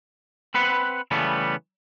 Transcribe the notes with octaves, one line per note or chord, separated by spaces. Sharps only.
C4 B4 F#5 B5
C#3 E3 G3 A3 B3